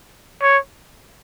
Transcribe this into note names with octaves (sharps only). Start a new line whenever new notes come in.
C#5